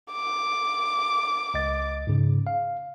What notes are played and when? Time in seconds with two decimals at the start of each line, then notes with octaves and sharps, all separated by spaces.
0.13 D6
1.54 C#2 D#5 A6
2.07 G#2 C#3
2.47 F5